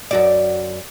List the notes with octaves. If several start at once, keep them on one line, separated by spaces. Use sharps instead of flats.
F#2 F#4 D5